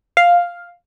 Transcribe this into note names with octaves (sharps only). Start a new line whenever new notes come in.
F5